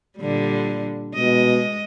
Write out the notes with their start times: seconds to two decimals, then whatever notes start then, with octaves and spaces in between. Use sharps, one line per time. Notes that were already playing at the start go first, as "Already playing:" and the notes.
0.19 A#2 D3 G3
1.14 B2 G#3 D#5